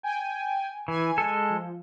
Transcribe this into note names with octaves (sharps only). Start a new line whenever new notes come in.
G5 G#5
E3 G#5
G#3 A4
F3